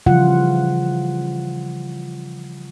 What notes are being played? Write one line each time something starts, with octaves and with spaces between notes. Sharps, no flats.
C#3 E3 F3 G3 F4 F#5